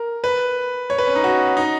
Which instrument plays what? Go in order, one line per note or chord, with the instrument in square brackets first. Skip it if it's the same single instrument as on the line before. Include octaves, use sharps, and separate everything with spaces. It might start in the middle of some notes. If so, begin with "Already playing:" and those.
Already playing: [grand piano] A#4
B4
C#5
B4
C#4
D#4
F#4
D#4